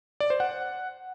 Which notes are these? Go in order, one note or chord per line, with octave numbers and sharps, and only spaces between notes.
D5
C5
F#5